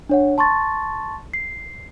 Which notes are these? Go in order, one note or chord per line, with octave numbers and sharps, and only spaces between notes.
D4 C#5 F#5
A5 C6 C#6 A6
C7